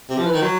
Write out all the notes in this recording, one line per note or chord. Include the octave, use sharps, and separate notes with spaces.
C3
F3
E3
D#3
F#3